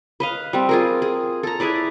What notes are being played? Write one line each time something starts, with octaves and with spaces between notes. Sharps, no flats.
B4 D#5 F5
G3 C4
F4 G#4 A#4
G#4
A4 A#5
E4 G#4 B4 D5